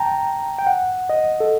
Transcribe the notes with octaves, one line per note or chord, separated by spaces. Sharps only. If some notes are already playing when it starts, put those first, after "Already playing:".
Already playing: G5 A5 A#5
G5
F#5
D#5
A4